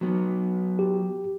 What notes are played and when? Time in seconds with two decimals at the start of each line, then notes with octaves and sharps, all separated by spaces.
0.01 F#3 B3
0.79 G4